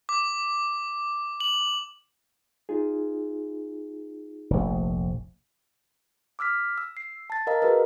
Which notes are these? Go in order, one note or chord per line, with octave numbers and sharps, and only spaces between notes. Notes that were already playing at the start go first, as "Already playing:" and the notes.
D6
F#7
D#4 F4 G#4
F1 A#1
D6 E6 F6 B6
E6
C7
A5 A6
A#4 D#5 F5 A#5
F#4 G#4 A#4 B4 D#5